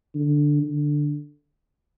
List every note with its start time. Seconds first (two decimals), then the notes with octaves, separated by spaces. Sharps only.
0.15 D3
0.63 D3